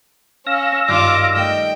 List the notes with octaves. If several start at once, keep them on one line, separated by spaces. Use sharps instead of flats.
C#4 F5 E6 A#6
G#1 G2 F4 D6 G6
A3 D#5 G5